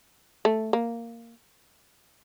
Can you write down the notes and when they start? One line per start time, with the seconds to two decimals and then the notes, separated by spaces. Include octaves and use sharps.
0.45 A3
0.73 A#3